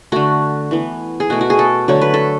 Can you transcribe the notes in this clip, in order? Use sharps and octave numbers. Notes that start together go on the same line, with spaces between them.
D3 A3 F#4
E3 B3
G#4
B2 A3 F#4
F#4
G#4
A4
D3 F#3 A3 C#5
B4
A4